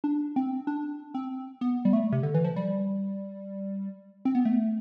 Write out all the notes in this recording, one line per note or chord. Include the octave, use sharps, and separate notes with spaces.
D4
C4
D4
C4
B3
G3
A3
C3
D3
E3
F3
G3
C4
B3
A3